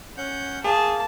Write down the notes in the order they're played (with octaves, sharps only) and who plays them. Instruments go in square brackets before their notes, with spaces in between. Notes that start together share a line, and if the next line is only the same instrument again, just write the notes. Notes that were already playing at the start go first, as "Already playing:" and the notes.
[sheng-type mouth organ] C#4 F#5 G6
[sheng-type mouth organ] A#3 [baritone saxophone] G#4 [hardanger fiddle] A5